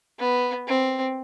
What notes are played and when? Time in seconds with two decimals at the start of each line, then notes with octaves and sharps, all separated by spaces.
0.19 B3
0.68 C4